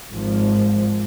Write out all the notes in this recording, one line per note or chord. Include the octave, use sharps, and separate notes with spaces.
G#1 G#2 F3